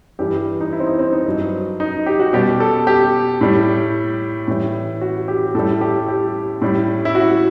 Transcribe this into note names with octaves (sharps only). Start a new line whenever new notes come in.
G2 E3 G3 G4
D#4
E4
C4
D#4
C4
D#4
G2 F#3
D#4
G4
F#4
B2 G3 G4
A4
G4
A2 G3
A2 E3 G3
F#4
G4
A2 G3 A4
G4
G4
A2 G3
E4
F#4